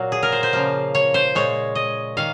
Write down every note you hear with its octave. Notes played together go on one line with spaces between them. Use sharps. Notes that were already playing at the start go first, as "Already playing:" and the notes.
Already playing: A#2 F#3 A#3 F#4
G#4
A#4
C5
C5
C#3 F3 A#3
C#5
C5
A#2 G#3 C#5
D#5
D#3 A#3 F5